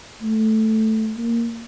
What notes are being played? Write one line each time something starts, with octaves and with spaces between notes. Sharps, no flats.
A3
A#3